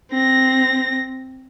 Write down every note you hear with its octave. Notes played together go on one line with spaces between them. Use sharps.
C4 A#6